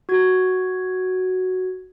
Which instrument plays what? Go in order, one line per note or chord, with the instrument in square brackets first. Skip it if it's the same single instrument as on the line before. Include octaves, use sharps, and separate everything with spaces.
[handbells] F#4 G#6